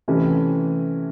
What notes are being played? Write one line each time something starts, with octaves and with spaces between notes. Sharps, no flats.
C3 E3 A3 C#4